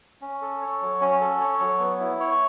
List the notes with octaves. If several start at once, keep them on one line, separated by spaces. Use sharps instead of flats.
C#4
A4
C#5
F#3
C#4
A4
C#5
F#3
B3
E4
C#5